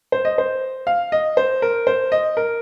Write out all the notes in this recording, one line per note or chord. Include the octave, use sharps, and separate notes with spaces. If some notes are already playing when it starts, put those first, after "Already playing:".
C5
D#5
C5
F5
D#5
C5
A#4
C5
D#5
A#4